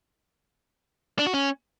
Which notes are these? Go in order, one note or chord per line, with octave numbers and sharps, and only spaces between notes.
D4
F#4
C#4